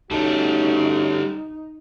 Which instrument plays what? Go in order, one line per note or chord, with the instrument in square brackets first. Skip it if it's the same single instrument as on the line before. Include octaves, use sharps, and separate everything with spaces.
[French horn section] A2 C#4 F#4 [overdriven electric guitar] G3 A4 [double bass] D#4